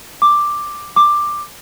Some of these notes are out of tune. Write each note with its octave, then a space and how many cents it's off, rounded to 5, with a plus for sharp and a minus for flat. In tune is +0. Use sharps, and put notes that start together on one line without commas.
D6 +5
D6 +10